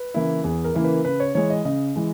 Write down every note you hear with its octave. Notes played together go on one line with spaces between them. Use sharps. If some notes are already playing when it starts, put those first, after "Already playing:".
Already playing: B4
C#3 E3 A#3 E4
E2 G#4
A#4
C#3 E3 A#3 E4
B4
C#3 B4
C#5
E3 G#3 C#5
D#5
C#3 D#5
E3 G#3